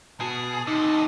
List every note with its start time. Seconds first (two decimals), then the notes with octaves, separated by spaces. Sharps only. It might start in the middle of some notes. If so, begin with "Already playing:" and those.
0.21 B2 G#4 A5
0.67 D#2 C3 D#4 D#5